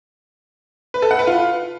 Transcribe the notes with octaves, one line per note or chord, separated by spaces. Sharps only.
B4
A4
F#5
B4
F4